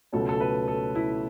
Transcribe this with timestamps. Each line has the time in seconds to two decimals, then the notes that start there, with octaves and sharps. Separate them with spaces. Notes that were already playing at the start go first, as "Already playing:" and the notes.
0.13 C#2 B2 F#3 A3 C#4 A4
0.29 A4
0.40 B4
0.68 A4
0.95 E4